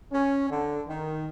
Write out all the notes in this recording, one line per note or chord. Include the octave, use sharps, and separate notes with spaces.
C#4
D3
D#3